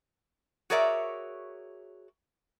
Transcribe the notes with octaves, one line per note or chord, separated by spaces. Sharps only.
F#4 G#4 A#4 C#5 D5 E5